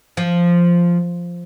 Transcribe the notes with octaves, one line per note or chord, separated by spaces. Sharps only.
F3